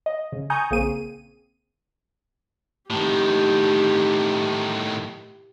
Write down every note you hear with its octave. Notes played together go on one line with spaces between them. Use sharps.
D#5
C#3
G#5 A#5 C#6 D#6 G6
A#1 C#3 A#3 C4 G#4 D#7
A2 D#3 G4